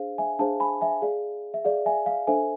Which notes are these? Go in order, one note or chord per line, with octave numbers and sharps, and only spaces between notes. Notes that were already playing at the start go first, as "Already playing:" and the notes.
Already playing: D4 G#4 C5 F5
E5 G#5
D4 G#4 C5 F5 A5
G#5 B5
E5 G#5
G#4 D5 F5
E5
G#4 D5 F5
E5 G#5
F5
D4 A4 C5 E5 G#5